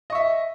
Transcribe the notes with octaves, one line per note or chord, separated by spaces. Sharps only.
D#5 E5 C#6